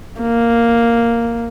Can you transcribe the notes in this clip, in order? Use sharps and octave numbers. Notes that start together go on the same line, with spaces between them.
A#3